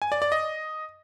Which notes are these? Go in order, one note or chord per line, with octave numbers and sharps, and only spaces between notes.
G#5
D5
D5
D#5